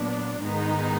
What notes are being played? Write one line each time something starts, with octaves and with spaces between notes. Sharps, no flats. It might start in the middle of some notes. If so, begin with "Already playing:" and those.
Already playing: A#2 F#3 B3 D4
G#2 D#3 G#3 B3 D#4